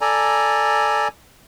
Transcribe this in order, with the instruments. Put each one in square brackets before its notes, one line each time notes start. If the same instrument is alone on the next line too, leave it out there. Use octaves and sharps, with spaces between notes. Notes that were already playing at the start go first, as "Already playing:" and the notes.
[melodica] A4 D5 G#5 A#5